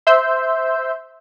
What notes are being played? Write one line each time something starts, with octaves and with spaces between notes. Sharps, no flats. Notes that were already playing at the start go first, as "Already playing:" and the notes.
C5 E5 C6 E6 G6